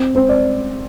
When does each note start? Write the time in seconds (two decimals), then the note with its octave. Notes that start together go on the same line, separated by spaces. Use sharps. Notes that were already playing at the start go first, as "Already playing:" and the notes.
Already playing: C4
0.15 C4 C5
0.29 D5